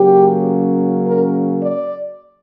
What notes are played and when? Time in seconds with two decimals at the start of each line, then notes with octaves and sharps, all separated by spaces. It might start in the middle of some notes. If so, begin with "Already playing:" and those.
Already playing: C#3 F#3 A#3 C#4 G4
1.06 A#4
1.63 D5